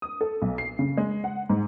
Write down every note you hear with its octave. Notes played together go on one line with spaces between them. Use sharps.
D#6
A4
B1
C7
C#3
G#3
F#5
G#2